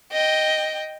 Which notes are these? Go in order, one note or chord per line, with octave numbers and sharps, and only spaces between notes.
D#5 G5